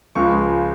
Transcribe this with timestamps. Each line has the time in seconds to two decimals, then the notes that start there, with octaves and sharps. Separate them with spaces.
0.15 C#2 C#3 F3 G#3 C#6